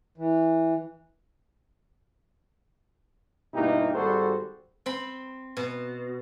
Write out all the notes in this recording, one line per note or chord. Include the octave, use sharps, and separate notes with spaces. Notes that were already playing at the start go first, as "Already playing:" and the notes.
E3
G2 B2 A#3 D#4 E4 G4
G#1 G3 F#4 G#4 A4 C5
C4 B5
B2